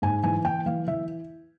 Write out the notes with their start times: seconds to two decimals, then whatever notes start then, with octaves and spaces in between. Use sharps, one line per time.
0.02 G#2 G#5
0.23 E3 G#5
0.44 E3 G5
0.66 E3 F5
0.87 E3 E5